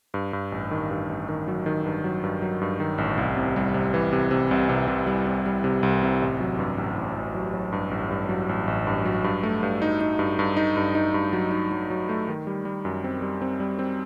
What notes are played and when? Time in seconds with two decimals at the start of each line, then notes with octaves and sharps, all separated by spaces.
0.14 G2
0.33 G2
0.52 A1
0.71 D#3
0.91 G2
1.09 A1
1.29 D#3
1.48 F#3
1.66 D#3
1.86 G2
2.04 F#3
2.24 G2
2.42 F#3
2.61 G2
2.80 D#3
2.98 A1
3.18 C2
3.37 C3
3.56 G3
3.74 C3
3.94 E3
4.13 C3
4.31 C3
4.51 C2
4.69 C3
4.88 C3
5.07 G3
5.27 C3
5.46 G3
5.64 C3
5.83 C2
6.03 C3
6.22 A1
6.40 F#3
6.59 G2
6.78 A1
6.97 A1
7.16 A1
7.35 F#3
7.54 F#3
7.72 G2
7.91 A1
8.11 G2
8.29 F#3
8.49 A1
8.68 A1
8.87 G2
9.05 F#3
9.24 G2
9.43 A3
9.63 G2
9.82 D#4
10.01 D#4
10.19 G2
10.39 G2
10.57 D#4
10.77 G2
10.95 D#4
11.14 G2
11.33 F#3
11.51 D#4
11.72 F#3
11.90 F#3
12.09 A3
12.28 D#3
12.47 G3
12.65 G3
12.85 F#2
13.04 C4
13.22 G3
13.42 C4
13.60 G3
13.79 C4